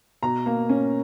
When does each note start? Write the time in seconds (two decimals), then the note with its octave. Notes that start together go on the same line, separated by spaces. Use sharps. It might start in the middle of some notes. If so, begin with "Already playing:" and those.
0.23 B2 A#5
0.46 A#3
0.69 C#4